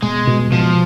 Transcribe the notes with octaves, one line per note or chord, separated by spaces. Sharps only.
B2 G#3
B2
B2 F3